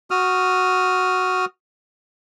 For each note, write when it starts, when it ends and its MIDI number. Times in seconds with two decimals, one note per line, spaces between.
0.11 1.45 66
0.11 1.45 87
0.11 1.45 89